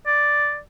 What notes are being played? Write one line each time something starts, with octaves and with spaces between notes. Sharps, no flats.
D5